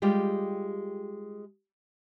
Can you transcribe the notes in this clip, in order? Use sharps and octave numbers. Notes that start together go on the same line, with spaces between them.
G3 G#3 F4 G4